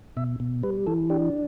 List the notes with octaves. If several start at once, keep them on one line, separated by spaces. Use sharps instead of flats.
B2 E5
B2
G3 B4
E3 A4
D4 G4